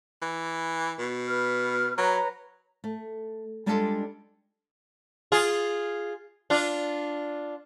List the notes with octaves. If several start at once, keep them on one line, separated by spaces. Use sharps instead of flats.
E3
B2
B4 F6
F#3 B4 C#5 A#5
A3
G3 G#3 D4 F4 G4 A4
F4 G#4
D4 F4